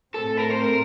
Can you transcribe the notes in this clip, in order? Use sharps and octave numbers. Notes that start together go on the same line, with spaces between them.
A2 A3 C4 A4
A#4
C5
A#4